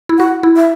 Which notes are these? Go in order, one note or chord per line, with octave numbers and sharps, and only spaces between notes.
E4
F#4 F#5
E4
E5